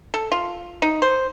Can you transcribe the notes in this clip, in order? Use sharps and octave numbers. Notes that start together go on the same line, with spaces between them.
A4
F4
D#4
C5